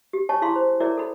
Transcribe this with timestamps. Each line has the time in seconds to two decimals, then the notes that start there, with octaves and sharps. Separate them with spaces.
0.13 G4
0.29 C#5 D#5 G#5 A5 C#6
0.42 E4 G#4 F5 C6 C#6
0.56 C5
0.80 E4 G#4 A#4 C#5 D5 E5
0.97 A4 B5